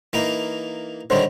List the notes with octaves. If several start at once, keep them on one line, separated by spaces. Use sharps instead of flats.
E3 A#3 D#4
D3 D#3 G3 C5 C#5